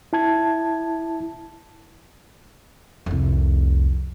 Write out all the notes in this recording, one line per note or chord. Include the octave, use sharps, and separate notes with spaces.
E4 A5 G#6
C2 F2